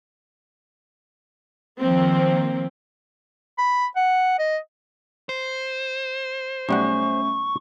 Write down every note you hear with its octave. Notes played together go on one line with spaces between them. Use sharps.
D#3 F3 A#3 C4
B5
F#5
D#5
C5
B1 G3 A3 C#4 F#5 C#6